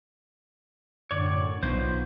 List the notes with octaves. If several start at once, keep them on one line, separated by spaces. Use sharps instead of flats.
F#2 A2 D3 C#5 D5
B1 B3 F4 C5